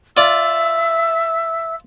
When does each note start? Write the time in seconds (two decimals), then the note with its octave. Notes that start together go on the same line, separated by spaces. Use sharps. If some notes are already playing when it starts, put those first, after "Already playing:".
0.17 F4 D5 E5 E6